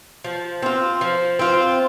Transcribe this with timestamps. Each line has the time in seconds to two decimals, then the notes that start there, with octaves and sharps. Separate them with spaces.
0.24 F3
0.63 C4 F4
1.01 F3
1.39 C4 F4